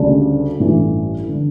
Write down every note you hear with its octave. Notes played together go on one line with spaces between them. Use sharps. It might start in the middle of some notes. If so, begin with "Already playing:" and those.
Already playing: D2 C#3 G3 D4
A1 G2 E3 A3
D3